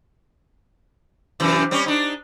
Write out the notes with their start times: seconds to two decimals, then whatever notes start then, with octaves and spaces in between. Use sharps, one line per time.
1.40 F#2 C3 E3
1.71 G3 C4 C#4
1.86 D4 D#4